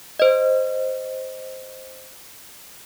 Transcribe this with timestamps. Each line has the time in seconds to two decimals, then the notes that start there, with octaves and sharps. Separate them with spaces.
0.20 C5 D#5